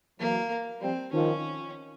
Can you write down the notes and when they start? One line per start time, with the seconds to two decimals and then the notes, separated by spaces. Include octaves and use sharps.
0.19 E3 F#3 A#3
0.81 F3 G3 C4
1.12 D#3 F3 C#4